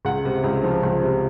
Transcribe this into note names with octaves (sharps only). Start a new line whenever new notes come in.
C#2 F#5
C3
C#2
F3
C#2
C3